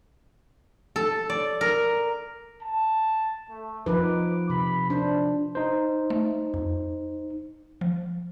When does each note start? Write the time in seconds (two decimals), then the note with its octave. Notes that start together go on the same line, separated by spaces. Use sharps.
0.96 A4
1.30 D5
1.61 A#4
2.63 A5
3.50 A3
3.86 F3 D#4 B4 D6
4.50 C3 B5
4.90 D4 C5
5.55 D#4 C5
6.10 A3
6.54 F2
7.81 F3